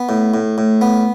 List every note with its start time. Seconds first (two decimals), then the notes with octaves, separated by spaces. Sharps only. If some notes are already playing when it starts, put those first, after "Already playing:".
Already playing: B3
0.09 A2
0.34 A2
0.58 A2
0.81 B3